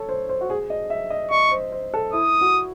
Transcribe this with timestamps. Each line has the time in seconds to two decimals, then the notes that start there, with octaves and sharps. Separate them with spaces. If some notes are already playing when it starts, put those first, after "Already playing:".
Already playing: A4 C#5
0.09 C5
0.29 C5
0.41 F#4
0.50 G#4
0.70 D#5
0.90 E5
1.10 D#5
1.31 D#5 C#6
1.51 C5
1.72 C5
1.94 A4
2.13 E4 D#6
2.41 F#4